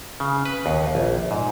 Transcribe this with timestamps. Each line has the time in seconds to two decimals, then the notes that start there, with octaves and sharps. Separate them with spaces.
0.20 C#3
0.46 B4
0.66 D#2
0.95 A#1
1.31 G#2